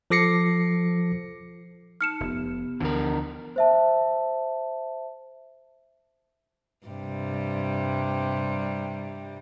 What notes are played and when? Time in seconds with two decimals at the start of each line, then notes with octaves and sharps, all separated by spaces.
0.10 F3 A4 D6 A#6 C7 C#7
2.01 D#4 A5 F6 C#7 E7
2.20 F1 B3 G4
2.80 D2 D3 E3 F3 A#4
3.56 C5 E5 A5
6.87 G2 C3 G3